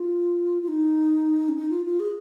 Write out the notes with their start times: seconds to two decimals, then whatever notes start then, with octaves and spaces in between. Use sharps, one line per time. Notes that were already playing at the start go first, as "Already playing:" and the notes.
Already playing: F4
0.63 F4
0.68 D#4
1.49 C#4
1.56 D#4
1.70 F4
1.85 F4
2.00 G#4